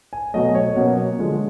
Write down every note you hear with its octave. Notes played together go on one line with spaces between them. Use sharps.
G#5
B2 F#3 A3 D#5
C#5
B2 F#3 A#3 C#4
D3 F3 G#3